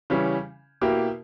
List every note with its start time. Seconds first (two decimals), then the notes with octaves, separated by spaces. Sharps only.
0.10 C#3 E3 G3 C#4
0.81 B2 A#3 E4 G4